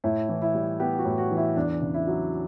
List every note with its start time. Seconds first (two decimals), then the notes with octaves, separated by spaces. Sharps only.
0.04 A2 E4
0.29 E3
0.42 E4
0.55 G3
0.80 B3 G4
0.99 F#4
1.05 A2
1.18 F#4
1.31 E3
1.37 E4
1.56 E2 D4
1.82 C#3
1.94 E4
2.07 F#3